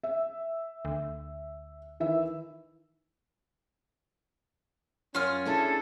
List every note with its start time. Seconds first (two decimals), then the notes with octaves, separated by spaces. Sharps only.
0.03 E5
0.85 D2
2.00 D#3 E3 E5
5.15 F#2 C#4 F4 F6
5.45 D4 E4 G#4 A4